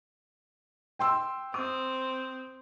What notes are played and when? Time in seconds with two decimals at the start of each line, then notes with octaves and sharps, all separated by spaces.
0.99 G5 C6 E6
1.54 C4 D#6